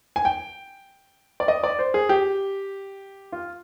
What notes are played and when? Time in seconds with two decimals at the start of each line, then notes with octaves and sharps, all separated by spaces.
0.16 G#5
0.25 G5
1.40 D5
1.48 D#5
1.64 D5
1.79 C5
1.94 G#4
2.09 G4
3.32 F4